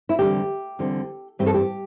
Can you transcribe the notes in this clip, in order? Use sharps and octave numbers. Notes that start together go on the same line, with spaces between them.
E4
E2 D3 G3 C4 G4
E2 D3 G3 C4
G2 E3 C4 G4
A4
G4